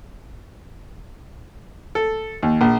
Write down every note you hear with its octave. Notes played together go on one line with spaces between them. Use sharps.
A4
D#2
A#1